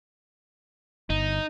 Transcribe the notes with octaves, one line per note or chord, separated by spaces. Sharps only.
G1 D#4